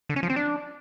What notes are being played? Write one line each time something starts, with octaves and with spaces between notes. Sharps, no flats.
D3
C#4
F3
C4
D4